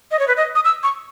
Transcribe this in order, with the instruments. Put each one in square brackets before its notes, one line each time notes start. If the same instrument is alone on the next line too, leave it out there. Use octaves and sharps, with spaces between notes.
[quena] D#5
C#5
B4
D#5
D#6
E6
C#6